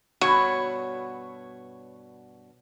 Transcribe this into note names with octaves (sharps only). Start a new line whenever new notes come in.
G2 B2 F#4 C#5